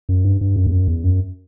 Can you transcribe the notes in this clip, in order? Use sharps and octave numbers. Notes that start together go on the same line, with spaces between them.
F#2
G2
G2
F#2
E2
F#2
E2
F#2